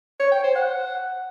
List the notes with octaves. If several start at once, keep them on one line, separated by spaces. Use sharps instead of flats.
C#5
G5
C5
F#5